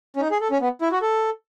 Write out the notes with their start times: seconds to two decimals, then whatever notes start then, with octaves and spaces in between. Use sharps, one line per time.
0.16 C#4
0.21 D#4
0.31 G#4
0.41 A4
0.51 C#4
0.61 B3
0.81 E4
0.92 F#4
1.02 A4